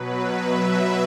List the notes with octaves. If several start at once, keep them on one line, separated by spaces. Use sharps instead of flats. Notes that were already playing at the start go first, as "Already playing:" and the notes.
Already playing: B2 F#3 B4
B4
E5